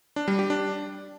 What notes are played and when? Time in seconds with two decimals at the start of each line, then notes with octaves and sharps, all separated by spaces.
0.16 D4
0.28 G3
0.39 G4
0.50 D4